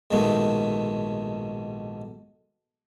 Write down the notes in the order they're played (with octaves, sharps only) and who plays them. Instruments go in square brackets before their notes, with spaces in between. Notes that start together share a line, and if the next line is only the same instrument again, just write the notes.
[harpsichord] A#1 G#2 B2 D#3 G#3 A3